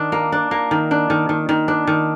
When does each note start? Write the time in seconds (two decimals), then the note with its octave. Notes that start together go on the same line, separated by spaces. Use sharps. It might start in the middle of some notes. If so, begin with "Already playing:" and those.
Already playing: D#3 D4
0.12 A#3
0.32 D4
0.51 A#3
0.71 D#3
0.91 D4
1.10 D#3
1.29 D#3
1.49 D#3
1.68 D4
1.87 D#3